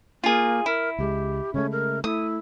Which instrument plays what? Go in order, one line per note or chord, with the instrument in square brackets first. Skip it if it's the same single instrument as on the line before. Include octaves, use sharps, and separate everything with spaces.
[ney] A#3 [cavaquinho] F4 G#4
[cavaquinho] E4 [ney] A#4
[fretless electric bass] C#2 G#3 [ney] G4
[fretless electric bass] C#3 G#3 A3 [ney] C#4
[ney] A#4
[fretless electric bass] A3 [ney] E4 [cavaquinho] D#6